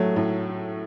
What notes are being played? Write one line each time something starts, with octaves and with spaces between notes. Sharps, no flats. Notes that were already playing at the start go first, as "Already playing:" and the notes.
Already playing: A2 F#3 A3
A2